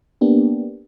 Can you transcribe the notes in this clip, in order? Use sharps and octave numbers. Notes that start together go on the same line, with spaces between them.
A#3 B3 D4 G4